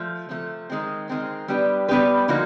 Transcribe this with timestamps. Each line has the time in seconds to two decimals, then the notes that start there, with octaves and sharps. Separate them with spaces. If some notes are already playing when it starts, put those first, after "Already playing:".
Already playing: F3 A3
0.29 C3 F3 A3
0.70 D#3 G#3 C4
1.09 D#3 G#3 C4
1.48 G3 B3 D4 G4 B4
1.88 G3 B3 D4 G4 B4
2.28 D3 F3 A#3 D#4 F#4